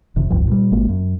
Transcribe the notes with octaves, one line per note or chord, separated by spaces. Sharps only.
F1 C3 D#3
F1 C#2 G2 F3
A#2 F#3 G3
G#1 G#3 A#3
F#2